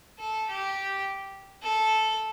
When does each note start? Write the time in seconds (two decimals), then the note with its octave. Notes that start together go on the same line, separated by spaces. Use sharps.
0.19 A4
0.49 G4
1.63 A4